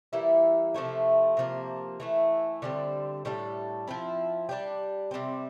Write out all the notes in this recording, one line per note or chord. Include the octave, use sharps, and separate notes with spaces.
E3 G3 A#3 E4
C3 F3 A3 E4
C3 F3 A#3
E3 A3 E4
D3 G3 C4
A2 G3 D4 A4
F3 C4 E4
G3 D4 G4
C3 G3 C4